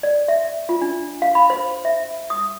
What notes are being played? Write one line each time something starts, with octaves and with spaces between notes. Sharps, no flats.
D5
E5
F4
D4
F5
B5
C5
E5
D#6